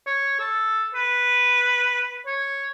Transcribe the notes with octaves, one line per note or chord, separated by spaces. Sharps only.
C#5
A4
B4
C#5